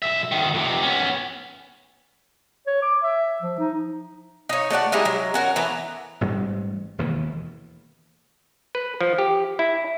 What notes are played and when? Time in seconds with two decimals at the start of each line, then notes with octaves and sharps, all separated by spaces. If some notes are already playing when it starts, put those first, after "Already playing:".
0.02 B1 E5
0.32 D2 D#3
0.54 F2 C3
0.83 B3 C#4
2.67 C#5
2.82 D6
3.03 E5
3.42 F3
3.59 D#4
4.49 D#4 C#5
4.70 A3 F#4 D5 F#5
4.92 G3 G#3 D#4 E4
5.05 F#3
5.34 C#4 F#4 A#4
5.56 E3 A3 B3 A#5
6.21 A1 G#2 G3
6.98 E1 D#2 E3
8.75 B4
9.01 F3
9.18 G4
9.59 E4